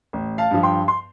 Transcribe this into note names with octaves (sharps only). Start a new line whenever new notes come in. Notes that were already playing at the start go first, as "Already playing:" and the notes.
A1
F5 A5
G2 F3
G5 C6
C6